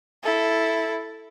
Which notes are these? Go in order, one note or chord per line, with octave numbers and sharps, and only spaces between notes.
E4 A4